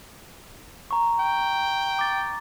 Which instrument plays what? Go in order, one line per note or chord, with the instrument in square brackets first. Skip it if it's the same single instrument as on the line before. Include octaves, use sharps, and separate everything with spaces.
[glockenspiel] A#5 C#6
[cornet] G5
[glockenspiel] D6 A6